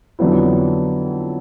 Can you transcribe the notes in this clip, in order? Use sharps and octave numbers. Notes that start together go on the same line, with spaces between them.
F2 D3 F#3 B3 E4